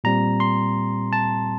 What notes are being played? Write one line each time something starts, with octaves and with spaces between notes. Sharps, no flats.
A#2 G3 C4 A#5
C6
A5